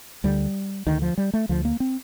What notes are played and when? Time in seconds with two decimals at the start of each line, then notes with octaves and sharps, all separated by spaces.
0.24 D2 D3 G3
0.87 D2 D3 D#3
1.02 F3
1.18 G3
1.33 A3
1.49 D2 D3 F3
1.65 A#3
1.80 C4